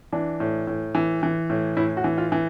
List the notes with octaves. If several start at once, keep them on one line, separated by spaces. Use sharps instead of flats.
E3 D4
A2
A2
E3
E3
A2
A2 E4
F#4
E3
F4
E3